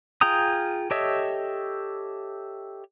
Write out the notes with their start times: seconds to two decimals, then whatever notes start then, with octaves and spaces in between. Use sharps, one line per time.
0.21 F4 G#4 G5 A#5 D#6
0.91 G4 A4 C#5 D#5 E5